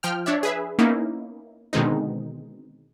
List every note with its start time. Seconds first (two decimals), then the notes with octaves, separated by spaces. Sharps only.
0.03 F3 G5 F6
0.26 D4 C#5 D5 E5
0.43 G#4 B4 E5
0.79 A#3 B3 C#4 D#4 E4
1.73 B2 D3 D#3 G#3 C4 D#4